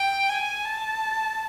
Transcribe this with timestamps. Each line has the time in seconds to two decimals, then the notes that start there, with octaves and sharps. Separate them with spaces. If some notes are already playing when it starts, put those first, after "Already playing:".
Already playing: G5
0.29 G#5
0.65 A5